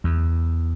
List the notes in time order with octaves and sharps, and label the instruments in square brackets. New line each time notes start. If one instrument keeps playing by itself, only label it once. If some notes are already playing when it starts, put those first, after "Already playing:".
[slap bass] E2